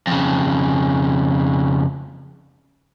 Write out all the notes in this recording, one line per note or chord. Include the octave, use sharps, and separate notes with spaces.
F2 C#3